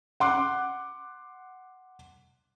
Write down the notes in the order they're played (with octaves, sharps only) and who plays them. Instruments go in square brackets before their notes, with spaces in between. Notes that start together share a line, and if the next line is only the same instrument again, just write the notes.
[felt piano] F#5 C6 D6 F#6